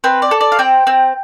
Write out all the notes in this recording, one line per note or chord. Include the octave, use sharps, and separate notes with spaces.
C4 B4
D5
A4
D5
F5
C4 G5
C4